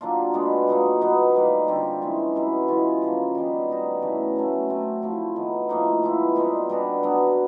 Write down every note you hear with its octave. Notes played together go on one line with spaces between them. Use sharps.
F#3 A#3 D4 F4
B2 G#3 B3 D4
A#2 F#3 A#3 D#4
B2 F#3 B3 D#4
D#3 G3 A#3
D3 G3 C4 F4
E3 G#3 C#4
B2 F#3 B3 E4
E3 G#3 C#4 F4
C#3 F3 A#3
D#3 G3 B3
G3 B3 D#4 F#4
C#3 E3 A3 C#4
C#3 F#3 A3 C#4
F#3 A3 C4
F3 A3 C4 E4
D#3 F#3 B3
A2 F3 A#3 D#4
F3 G#3 B3 E4
B2 G3 C4 D#4
G3 B3 D4 F#4
F#3 B3 D4